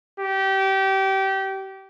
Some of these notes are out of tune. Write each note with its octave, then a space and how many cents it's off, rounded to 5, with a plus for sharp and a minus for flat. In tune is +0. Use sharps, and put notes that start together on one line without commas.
G4 -25